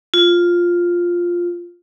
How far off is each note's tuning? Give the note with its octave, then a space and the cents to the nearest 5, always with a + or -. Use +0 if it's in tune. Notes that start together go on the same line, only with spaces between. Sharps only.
F4 +0